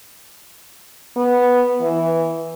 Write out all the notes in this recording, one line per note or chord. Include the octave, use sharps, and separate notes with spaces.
B3
E3